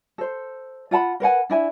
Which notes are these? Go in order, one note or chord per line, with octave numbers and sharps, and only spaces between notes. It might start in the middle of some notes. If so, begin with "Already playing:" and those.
A4 C5
F4 F#5 A5 B5
A#4 B4 F#5 G#5
D4 E4 G#5